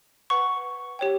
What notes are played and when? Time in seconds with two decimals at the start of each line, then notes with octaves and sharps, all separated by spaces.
0.30 B4 F#5 C#6
0.99 G4 C#5 G5